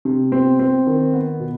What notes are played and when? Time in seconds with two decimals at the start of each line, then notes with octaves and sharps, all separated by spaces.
0.05 C3
0.32 C4
0.59 C4
0.87 D#3
1.13 B3
1.40 B2